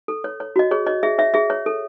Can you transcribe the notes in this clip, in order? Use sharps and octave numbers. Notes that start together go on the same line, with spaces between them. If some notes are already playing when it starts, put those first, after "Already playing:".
A4
C#5
C#5
F#4 D#5
G#4 C#5
C#5 D#5
G#4 E5
C#5 E5
G#4 E5
C#5
A4